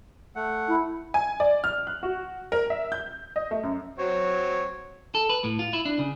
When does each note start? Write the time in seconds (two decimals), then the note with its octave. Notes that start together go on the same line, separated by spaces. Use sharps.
0.36 A3 F#5
0.68 E4
1.14 G#5
1.40 D5
1.64 F6
1.87 F#6
2.03 F#4
2.52 A#4
2.70 E5
2.92 G6
3.36 D#5
3.51 A3
3.63 F#2
3.99 F#3 C4 C#5
5.15 A4
5.30 B4
5.44 A2
5.59 F4
5.73 E4
5.85 D4
5.99 C#3